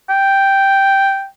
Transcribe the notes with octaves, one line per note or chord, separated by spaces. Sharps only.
G5